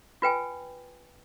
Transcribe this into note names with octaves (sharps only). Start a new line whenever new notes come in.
F4 B4 G5 G#5